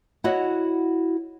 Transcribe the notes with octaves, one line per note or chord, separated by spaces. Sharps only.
E4 F#4 C#5 D#5 F#5